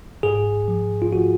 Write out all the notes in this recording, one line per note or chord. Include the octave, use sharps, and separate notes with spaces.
G#2 G#4
F3
F4
F3 F#4